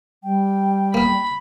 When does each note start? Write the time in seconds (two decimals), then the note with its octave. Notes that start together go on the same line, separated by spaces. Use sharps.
0.23 G3 G5
0.94 A#3 B3 B5